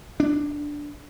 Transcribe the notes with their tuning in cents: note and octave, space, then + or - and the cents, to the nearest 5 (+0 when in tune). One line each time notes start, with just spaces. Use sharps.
D4 +0